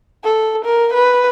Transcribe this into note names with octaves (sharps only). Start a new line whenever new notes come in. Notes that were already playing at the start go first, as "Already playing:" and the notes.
A4
A#4
B4